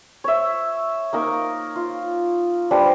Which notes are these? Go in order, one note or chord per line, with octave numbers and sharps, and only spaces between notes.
C#5 E5
A#3 D#4 A#4 C#6
F4
G3 D4 B4 C5